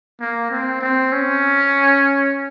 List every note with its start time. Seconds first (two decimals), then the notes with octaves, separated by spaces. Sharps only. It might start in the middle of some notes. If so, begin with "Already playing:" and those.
0.21 A#3
0.51 C4
0.81 C4
1.12 C#4